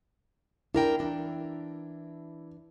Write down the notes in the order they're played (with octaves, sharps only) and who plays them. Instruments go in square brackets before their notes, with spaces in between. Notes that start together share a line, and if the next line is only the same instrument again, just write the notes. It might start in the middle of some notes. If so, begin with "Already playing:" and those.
[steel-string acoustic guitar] D4 A#4 G5 [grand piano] E4
[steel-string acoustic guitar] E3 D4